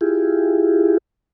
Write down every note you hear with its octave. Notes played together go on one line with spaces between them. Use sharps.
E4 F4 G4 G#4